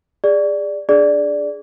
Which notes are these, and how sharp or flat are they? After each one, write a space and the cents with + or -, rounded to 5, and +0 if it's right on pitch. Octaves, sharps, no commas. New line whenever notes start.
G#4 -25 D5 +0
D4 +0 G#4 +5 D5 +0